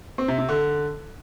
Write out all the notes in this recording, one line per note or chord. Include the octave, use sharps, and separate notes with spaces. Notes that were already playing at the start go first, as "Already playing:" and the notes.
C4
C3
C3
D3